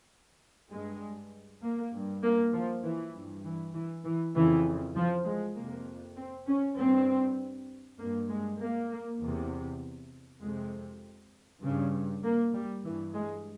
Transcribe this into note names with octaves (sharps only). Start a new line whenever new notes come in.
G2 G#3
A#3
G2
A#3
F3
E3
G2
E3
E3
E3
F2 C#3 E3
F3
G#3
F2 C3 A#3
C4
C#4
G2 C4
G2 A#3
G#3
A#3
E2 C3
F2 C3 G#3
G2 C#3
A#3
G3
G2 E3
G#3